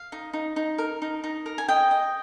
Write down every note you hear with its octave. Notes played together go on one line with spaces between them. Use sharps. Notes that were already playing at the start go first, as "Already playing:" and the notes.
Already playing: F5
D#4
D#4
D#4
A#4
D#4
D#4
A#4
G#5
D#5 G5
D#5